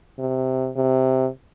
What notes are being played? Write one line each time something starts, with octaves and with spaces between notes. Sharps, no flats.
C3
C3